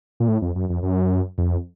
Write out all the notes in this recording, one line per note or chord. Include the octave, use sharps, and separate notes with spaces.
A#2
A2
F2
F#2
F2
F#2
F2